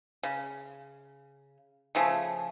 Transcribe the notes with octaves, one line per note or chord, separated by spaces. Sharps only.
C#3
C#3 F3 A3 G#4